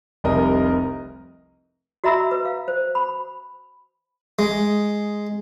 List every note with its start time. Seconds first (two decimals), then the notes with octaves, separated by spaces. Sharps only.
0.24 F1 C2 C3 A#4 D#5
2.04 F#4 D#5 E5 A#5 B5 E6
2.31 B4
2.45 F5
2.68 C5
2.95 B5
4.39 G#3